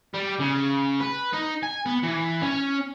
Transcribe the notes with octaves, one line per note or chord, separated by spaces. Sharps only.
G3
C#3
B4
D#4
G#5
B3
E3
C#4